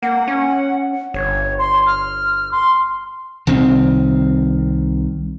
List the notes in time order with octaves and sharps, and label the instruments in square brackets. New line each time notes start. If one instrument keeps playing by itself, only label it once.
[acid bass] A#3 [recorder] F#5
[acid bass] C#4
[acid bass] G1 [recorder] C#5
[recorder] C6
F6
C6
[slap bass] C2 D#3 C4